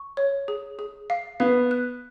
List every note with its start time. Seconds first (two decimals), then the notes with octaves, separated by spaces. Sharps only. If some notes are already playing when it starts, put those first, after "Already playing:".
Already playing: C#6
0.17 C#5
0.48 G#4
0.79 G#4
1.10 F5
1.40 B3 F5
1.71 F#6